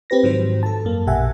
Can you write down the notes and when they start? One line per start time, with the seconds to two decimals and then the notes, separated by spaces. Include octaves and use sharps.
0.10 C4 G4 B4 A#6
0.23 G#2 D#3 F3 F#3 C5
0.63 A4 A5
0.85 F#2 A#3
1.07 A#1 B2 G4 E5 F#5 G#5